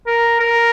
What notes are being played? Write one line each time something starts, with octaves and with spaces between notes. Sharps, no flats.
A#4
A#4